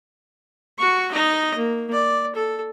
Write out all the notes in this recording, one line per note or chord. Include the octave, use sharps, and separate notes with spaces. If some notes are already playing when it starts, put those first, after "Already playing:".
F#4 C#6
D#4 D#5
A#3
D5
A4